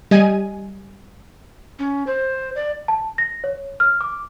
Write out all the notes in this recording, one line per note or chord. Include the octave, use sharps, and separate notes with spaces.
G3 D#5 G#5 D#7
C#4
C5
D5
A5
A#6
C#5
F6
D6